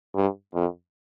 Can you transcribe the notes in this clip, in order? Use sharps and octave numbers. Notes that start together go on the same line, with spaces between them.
G2
F2